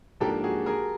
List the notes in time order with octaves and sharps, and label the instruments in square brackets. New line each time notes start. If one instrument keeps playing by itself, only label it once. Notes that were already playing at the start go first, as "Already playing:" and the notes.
[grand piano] G#2 F3 A#3 D4 [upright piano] G4 A4
[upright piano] F#4 G#4
G#4 A#4